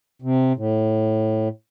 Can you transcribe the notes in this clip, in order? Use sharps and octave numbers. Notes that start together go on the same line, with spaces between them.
C3
A2